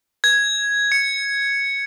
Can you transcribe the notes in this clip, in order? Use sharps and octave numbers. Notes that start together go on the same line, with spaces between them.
G#6
C#7